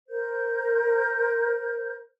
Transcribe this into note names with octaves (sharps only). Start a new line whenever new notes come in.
A#4 C5 G6